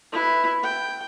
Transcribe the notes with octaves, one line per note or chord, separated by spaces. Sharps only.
E4 B4
G5